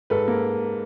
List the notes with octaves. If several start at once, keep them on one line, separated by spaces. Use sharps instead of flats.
G#2 A4 B4
A#3